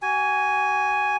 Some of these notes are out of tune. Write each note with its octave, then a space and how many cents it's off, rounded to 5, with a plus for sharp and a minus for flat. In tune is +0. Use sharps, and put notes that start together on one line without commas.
F#4 +35 G#5 +0